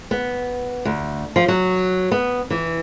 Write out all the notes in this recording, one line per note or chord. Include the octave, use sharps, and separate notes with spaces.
B3
D2
F3
F#3
B3
E3